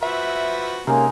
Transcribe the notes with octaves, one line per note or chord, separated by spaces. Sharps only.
F3 F#4 B4 E5
C3 G#3 A#3 C#4 D#4 A#4